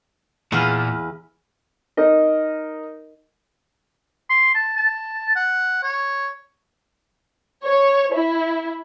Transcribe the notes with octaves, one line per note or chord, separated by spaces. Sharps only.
E2 A#2 B4 F5
D#4 A#4 D#5
C6
A5
A5
F#5
C#5
C#5
E4